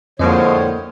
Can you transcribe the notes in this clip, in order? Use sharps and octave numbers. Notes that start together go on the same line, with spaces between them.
F2 A2 D3 F3 G#3 A#3 C#5 D#5